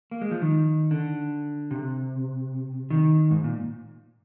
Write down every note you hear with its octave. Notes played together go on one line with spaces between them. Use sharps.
A#3
G#3
F3
D#3
D3
C3
D#3
G#2
A#2